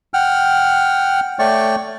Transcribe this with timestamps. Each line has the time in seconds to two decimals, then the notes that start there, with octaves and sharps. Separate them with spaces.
0.14 F#5 G5 F6
1.39 A3 C#5 D5 G5 C#6